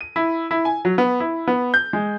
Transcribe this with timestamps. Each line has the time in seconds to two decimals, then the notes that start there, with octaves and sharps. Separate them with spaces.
0.01 D#7
0.16 E4
0.51 E4
0.65 G#5
0.85 F#3
0.98 B3
1.20 E4
1.48 B3
1.74 G6
1.93 G#3